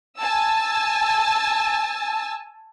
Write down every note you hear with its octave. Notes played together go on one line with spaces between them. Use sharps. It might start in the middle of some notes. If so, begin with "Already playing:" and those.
G#5 A5 E6